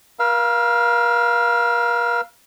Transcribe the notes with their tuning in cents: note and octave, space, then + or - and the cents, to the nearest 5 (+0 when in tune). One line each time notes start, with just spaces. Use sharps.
A#4 +45 F5 +0 E6 +20